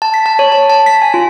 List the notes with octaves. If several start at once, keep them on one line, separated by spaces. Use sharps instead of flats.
A5
B6
A5
C#5
A5
A5
B6
G#5
F4